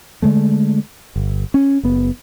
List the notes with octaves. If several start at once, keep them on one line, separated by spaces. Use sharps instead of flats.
D3 G#3 A3
G1
C#4
F#1 B3